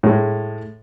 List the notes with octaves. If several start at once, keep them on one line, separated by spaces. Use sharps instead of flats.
A2 G#3